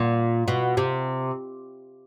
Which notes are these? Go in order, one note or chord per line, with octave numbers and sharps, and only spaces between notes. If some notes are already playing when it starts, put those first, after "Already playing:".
Already playing: A#2
B2
C3